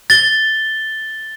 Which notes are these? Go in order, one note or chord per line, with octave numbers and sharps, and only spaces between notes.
A6 G7